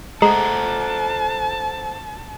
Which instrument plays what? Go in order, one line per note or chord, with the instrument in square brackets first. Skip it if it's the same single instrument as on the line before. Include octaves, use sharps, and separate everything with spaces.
[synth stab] G#3 [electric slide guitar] A4 C5 F#5 [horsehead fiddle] A5 [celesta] A#5